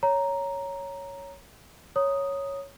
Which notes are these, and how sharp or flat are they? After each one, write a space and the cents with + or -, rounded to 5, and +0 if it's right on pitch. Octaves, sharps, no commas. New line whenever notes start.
C#5 +5 A#5 +0
C#5 +0 A#5 +0 D#6 +0